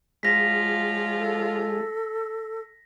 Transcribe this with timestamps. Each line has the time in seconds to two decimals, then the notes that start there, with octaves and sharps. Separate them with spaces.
0.23 F3 F#3 G#3 F4 A#6 B6
1.19 A4